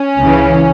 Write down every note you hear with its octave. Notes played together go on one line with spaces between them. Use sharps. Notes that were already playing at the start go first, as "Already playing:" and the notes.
Already playing: C#4
C#2 C#3 E3